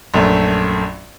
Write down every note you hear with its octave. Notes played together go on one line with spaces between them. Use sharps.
A#1 F#2 A3